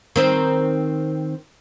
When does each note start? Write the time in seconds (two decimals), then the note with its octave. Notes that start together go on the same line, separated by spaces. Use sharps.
0.16 D#3 C4 C5